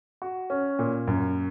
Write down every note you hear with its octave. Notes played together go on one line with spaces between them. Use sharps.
F#4
C#4
A#2
F#2